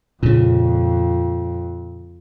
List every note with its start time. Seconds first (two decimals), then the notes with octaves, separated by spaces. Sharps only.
0.23 F2 A#2 C#3